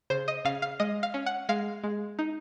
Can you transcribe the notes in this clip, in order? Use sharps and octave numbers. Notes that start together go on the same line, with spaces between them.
C#3 C5
D#5
C#3 F5
F5
G#3 D#5
F5
C#4
F#5
G#3 F5
G#3
D#4